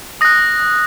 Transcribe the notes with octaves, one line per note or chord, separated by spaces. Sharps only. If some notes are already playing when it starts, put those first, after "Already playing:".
D#6 F#6 A#6